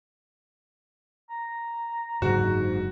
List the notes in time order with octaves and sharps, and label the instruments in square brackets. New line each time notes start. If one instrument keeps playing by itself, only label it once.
[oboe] A#5
[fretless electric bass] F#1 D3 [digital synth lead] G#2 [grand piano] F#4